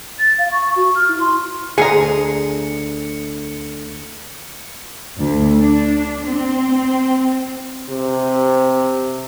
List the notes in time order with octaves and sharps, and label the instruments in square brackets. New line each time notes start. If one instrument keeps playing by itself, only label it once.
[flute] A6
F5
C#6
F#4
F6
E4
C6
[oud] D2 G#4 [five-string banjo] G#5 A#5 [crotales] C#7
[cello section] D2
D4
C4
[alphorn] C3